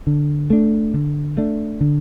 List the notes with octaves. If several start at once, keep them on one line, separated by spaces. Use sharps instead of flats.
D3
A3 D4
D3
A3 D4
D3